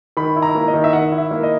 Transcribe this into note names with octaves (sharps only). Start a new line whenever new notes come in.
D#3 B5
E4
A#5
A#3
D#5
D#3
E5
D#3 F#5
E4
E5
A#3
D#5